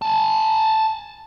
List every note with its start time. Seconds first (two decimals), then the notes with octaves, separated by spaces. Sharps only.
0.02 G#5 A5